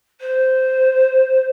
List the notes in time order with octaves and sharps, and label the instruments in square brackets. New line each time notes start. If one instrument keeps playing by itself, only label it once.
[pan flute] C5